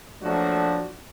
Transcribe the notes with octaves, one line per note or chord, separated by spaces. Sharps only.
F3 F#3 A3 A#3 D4 F#4